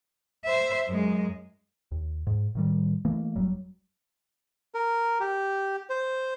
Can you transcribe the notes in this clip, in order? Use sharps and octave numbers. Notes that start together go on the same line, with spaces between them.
C5 E5
F#2 G#3
D#2
G#2
A2 D#3 G3
E3 A3 A#3
G1 F#2 F#3 G3
A#4
G4
C5